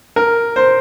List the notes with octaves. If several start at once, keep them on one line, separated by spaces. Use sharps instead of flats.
A#4
C5